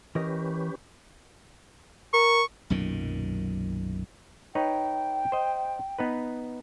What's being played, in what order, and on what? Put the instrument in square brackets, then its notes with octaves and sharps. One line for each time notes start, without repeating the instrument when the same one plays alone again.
[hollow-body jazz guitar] E3 A#4 D#5 [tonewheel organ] C#4 G4 B4
[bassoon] A#4 [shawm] C#6
[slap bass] B1 F#2 A#2 D#3
[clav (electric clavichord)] D#4 B4 C#5 [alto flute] G5
[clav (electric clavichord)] C5 D#5
B3 D#4 B4